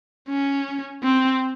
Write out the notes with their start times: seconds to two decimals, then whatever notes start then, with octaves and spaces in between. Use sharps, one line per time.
0.29 C#4
1.04 C4